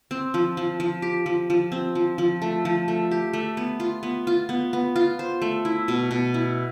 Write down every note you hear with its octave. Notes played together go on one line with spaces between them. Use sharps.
C4
F3
F3
F3
G4
F3
F3
C4
F3
F3
A3
F3
A3
G4
A3
B3
F4
B3
F4
B3
B3
F4
C5
A3
E4
B2
B2
E4